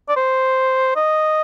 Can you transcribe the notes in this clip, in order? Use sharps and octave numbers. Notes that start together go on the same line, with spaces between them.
D5
C5
D#5